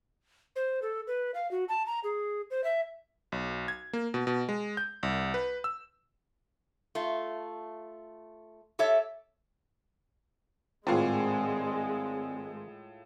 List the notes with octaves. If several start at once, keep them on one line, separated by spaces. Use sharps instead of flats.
C5
A4
B4
F5
F#4
A5
A#5
G#4
C5
E5
B1
G#6
A#3
B2
B2
G#3
G6
C2
B4
E6
A3 F4
G4 A4 C#5 E5
G#1 A2 G#3 C4 F4 G#4 D5 G#5